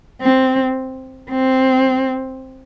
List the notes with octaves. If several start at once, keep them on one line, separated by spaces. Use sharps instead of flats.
C4
C4